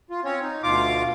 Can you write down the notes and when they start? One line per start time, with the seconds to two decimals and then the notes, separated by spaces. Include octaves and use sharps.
0.10 F4
0.24 C4 C#4 C#5
0.42 D#4
0.63 D2 B2 F4 F5 D6